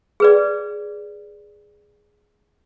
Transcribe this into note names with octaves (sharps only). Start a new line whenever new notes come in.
G#4 B4 D5